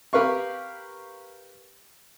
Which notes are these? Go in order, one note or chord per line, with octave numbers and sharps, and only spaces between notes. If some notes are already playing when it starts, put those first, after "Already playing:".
G4 A#4 B4 F5 C#6